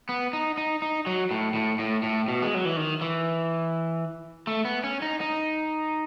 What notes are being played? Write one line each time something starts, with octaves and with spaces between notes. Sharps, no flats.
B3
D#4
D#4
D#4
F#3
A2
A2
A2
A2
B2
G#3
F#3
E3
D#3
E3
A3
B3
C#4
D#4
D#4